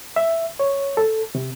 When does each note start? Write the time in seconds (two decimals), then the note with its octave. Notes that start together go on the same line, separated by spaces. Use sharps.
0.16 E5
0.59 C#5
0.97 A4
1.35 C3